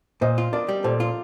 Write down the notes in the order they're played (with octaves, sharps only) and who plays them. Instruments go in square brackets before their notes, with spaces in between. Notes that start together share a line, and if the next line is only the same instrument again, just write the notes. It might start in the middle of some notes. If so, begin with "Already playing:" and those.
[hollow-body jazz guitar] A#2 [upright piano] C5 D#5
[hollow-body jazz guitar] F4
[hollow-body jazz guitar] D4 [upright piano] A#4 D5
[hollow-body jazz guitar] G3
[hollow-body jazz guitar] A#2 [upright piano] A4 C5
[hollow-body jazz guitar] F4